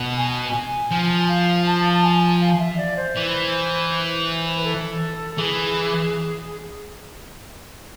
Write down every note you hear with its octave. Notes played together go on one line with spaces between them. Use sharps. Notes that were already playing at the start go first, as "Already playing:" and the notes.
Already playing: B2
G#5
F3 G#5
F5
A5
A5
G#5
F5
E5
D5
C5
E3
B4
A4
E3 G#4